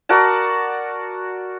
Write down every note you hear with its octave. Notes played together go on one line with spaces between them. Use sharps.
F#4 A#4 D5 A5